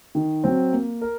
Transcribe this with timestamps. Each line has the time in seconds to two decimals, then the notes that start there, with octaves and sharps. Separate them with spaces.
0.15 D#3
0.44 F#3 C4
0.73 A#3
1.02 A#4